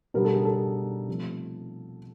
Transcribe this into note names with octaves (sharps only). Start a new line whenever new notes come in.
B2 G3 B3 D4 A#4
A4
G#4
A4
C3 F3 A3